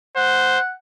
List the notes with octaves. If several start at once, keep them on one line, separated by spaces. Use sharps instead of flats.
C5 F#5